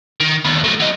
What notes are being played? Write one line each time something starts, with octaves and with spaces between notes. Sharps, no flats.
D#3
D#2 B3
F#3 A3
F#3 D#5